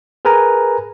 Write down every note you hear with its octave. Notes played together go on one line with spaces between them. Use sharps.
G#4 A#4 B4 G#5 A#5